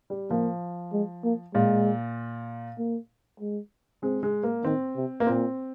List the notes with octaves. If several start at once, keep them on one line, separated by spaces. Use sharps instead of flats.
G3
F3 A#3
G#3
A#3
A#2 G#3
A#3
G#3
G#3 C4
G#3
A#3
D#3 C4
C3
A#3
A#2 C4